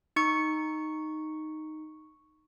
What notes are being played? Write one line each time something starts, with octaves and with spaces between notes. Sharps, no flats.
D#4 C#6 C#7